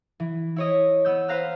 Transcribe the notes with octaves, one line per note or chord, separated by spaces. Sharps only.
E3
E4 C#5 D#5
B3 E6 G6
B4 C5 F5 A#5 F6 F#6